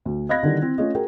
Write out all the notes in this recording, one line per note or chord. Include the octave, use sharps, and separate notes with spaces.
D2
D#5 F5 B5 F#6 G#6 A#6
D3 D#3 G3 E4
C4 E4
A3 C#4 F4 A4 D#5
F#4 G#4 A#4 G5